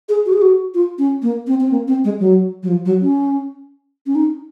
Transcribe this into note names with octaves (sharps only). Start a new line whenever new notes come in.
G#4
F#4
G#4
F#4
F4
C#4
A#3
C4
C4
A#3
C4
G#3
F#3
F#3
F3
F#3
C#4
C#4
D#4